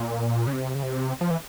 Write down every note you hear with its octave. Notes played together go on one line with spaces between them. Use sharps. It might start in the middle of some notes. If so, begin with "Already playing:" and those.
Already playing: A#2
C#3
C3
C#3
C3
F3
E3